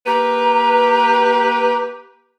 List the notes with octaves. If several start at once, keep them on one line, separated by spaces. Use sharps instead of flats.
A#3 G4 B4 A#5